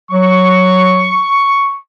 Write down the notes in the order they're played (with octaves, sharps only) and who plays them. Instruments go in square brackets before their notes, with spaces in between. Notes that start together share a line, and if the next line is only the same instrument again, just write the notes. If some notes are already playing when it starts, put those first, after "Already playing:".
[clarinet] F#3 [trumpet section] C#6